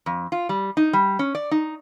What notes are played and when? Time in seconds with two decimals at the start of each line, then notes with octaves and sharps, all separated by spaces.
0.06 F2
0.32 F4
0.49 G3
0.77 D#4
0.93 G3
1.19 C#4
1.35 D5
1.51 D#4